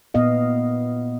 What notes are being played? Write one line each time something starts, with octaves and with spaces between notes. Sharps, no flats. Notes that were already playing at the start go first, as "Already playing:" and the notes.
A#2 B3 D#5 F5